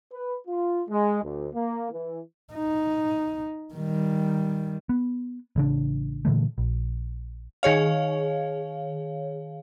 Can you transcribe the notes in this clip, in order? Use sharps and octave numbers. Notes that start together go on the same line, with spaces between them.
B4
F4
G#3
D2
A#3
E3
D#4
D#3 G3
B3
A1 C#3 D4
A#2 D3 E3 A3
A#1
D#3 G#4 C#5 F5